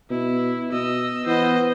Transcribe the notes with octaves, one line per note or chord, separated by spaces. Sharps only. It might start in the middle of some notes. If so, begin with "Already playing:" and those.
B2 E4
B2 D#5 E6
E3 B3 C5 D#5